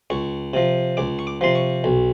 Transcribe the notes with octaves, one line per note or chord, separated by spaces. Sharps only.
C#2 C#6
C3 F3
C#2 D6
C#6
D6
C3 F3 C6
C#6
B1